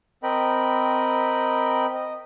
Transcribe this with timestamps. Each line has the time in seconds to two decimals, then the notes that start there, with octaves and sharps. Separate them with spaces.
0.23 C4 A#4 D#5 G5 B5
1.94 D#5